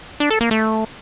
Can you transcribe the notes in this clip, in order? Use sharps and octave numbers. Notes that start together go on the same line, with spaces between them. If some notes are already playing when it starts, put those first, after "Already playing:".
D4
A4
A#3
A3